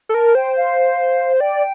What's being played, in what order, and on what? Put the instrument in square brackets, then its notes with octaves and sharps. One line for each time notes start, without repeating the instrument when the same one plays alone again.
[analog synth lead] A4
[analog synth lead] A#4 [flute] A5
[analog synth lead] C5 [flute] G5
[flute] F5
[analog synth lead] D5 [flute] G5